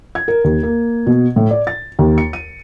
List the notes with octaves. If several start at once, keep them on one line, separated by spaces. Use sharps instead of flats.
G#6
A#4
D#2
A#3
B2
A2
D5
A6
D#2
C#7
D#7